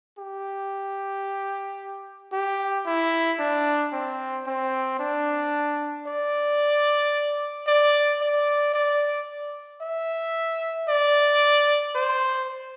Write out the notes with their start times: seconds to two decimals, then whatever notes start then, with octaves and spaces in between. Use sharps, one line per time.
0.18 G4
2.32 G4
2.86 E4
3.39 D4
3.93 C4
4.46 C4
4.99 D4
6.07 D5
7.67 D5
8.21 D5
8.74 D5
9.81 E5
10.88 D5
11.95 C5